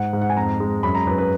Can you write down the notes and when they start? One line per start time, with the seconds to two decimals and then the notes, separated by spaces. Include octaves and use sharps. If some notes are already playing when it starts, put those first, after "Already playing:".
Already playing: G#2 F#5
0.13 G#2
0.22 F#5
0.30 G#5
0.36 F2 A#5
0.60 G#3
0.83 F#2 B5
0.95 A#5
1.07 F#2 B4
1.18 B4